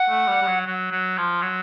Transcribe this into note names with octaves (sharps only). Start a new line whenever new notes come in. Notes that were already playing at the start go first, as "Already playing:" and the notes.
Already playing: F#5
A3
G3
G3
F#3
F#3
F#3
F3
F#3